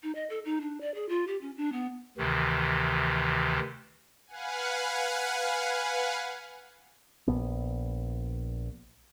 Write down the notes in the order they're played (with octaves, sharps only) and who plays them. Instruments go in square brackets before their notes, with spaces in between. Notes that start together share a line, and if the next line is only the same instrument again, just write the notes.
[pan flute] D#4
D#5
A4
D#4
D4
D5
G#4
F4
G4
C#4
D4
B3
[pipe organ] D2 C3 D#3 E3
[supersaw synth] B4 F5 F#5 G#5
[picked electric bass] A#1 B3